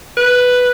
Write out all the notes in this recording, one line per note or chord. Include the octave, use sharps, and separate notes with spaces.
B4